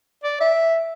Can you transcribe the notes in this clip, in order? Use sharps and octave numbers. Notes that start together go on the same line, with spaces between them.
D5
E5